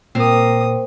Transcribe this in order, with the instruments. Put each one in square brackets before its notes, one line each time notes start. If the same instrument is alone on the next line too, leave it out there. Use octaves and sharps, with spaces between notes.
[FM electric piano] A#2 [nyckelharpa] A#3 D#6 [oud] C4